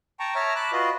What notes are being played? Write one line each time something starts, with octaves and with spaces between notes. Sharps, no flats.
G5 A5 A#5 C#6
C#5 E5 A5 A#5 F6
A5 B5 D6 F#6
F4 F#4 B4 D#5